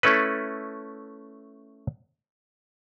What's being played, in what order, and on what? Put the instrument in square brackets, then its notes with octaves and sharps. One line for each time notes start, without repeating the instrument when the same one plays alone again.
[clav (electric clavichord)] A3 C#4 E4 A4 B4